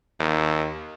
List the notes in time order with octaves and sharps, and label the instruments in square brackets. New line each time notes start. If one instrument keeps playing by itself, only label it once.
[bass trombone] D#2